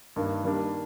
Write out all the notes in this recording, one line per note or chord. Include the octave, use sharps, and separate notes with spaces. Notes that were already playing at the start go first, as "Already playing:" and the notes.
G2 D#3 A#3 D4
D#3 G3 A#3 D4